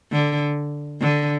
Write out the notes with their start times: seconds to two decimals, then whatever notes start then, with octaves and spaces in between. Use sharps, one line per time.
0.12 D3
1.01 D3